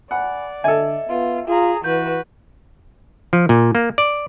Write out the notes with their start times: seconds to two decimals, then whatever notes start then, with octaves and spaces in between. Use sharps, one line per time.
0.11 D5 F#5 G#5 B5
0.64 D3 A4 D#5 E5 G#5
1.09 B3 F4
1.48 F4 G#4 A#5
1.84 E3 F#4 B4 G6
3.33 F3
3.49 A#2
3.75 A#3
3.98 D5